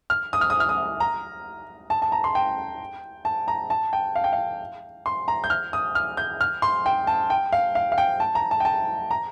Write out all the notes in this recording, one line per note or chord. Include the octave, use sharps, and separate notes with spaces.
F6
D#6
F6
D#6
F6
D#6
A#5
A5
A5
A#5
C6
G5
A5
A#5
A5
G5
F5
G5
F5
C6
A#5
G6
F6
D#6
F6
G6
F6
C6
G5
A5
G5
F5
F5
F5
G5
A5
A#5
A5
G5
A5
A#5